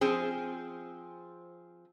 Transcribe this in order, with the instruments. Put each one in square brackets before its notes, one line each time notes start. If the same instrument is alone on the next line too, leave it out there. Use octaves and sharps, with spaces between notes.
[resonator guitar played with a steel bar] F3 C4 G#4